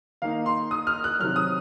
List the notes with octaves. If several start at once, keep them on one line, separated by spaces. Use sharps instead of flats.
D#3 A#3 D#4 F5
C6
D#6
F6
F#6
C3 D#3 F#3 F6
D#6